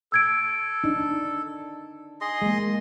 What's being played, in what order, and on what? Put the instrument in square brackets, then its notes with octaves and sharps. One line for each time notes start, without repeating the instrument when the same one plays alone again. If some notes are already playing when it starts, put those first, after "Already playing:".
[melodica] A4 [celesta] E6 G#6 D7
[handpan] D4 D#4
[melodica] G#4 D#5 C6
[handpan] G#3 A#3